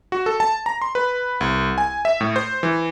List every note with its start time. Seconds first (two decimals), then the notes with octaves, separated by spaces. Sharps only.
0.12 F#4
0.26 A4
0.40 A5
0.66 A#5
0.82 C6
0.95 B4
1.41 C2
1.78 G#5
2.05 E5
2.21 A2
2.36 C5
2.63 E3